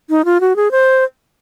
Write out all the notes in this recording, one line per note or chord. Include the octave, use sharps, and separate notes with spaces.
D#4
F4
F#4
G#4
C5